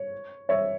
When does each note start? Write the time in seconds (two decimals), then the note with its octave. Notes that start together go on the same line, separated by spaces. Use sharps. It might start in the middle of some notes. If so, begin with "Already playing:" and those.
Already playing: C#5
0.49 C#5 E5